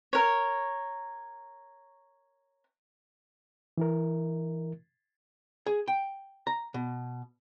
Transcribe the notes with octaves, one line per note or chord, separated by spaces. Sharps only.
A#4 C#5
E3 E4 A#4
G#4
G5
A#5
B2